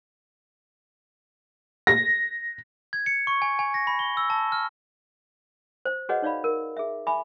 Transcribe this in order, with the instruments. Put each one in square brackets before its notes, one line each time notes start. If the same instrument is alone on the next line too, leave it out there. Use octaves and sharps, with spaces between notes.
[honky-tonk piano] A#6
[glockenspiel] G#6
C#7
C#6
G#5
G#5
A#6
B5
G7
E6
A5
F6
[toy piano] C5
F#4 G#4 B4 C#5 D#5 F#5
D#4 C#5 D5 F5 B5
A#4
G#4 E5
E5 G#5 B5 D6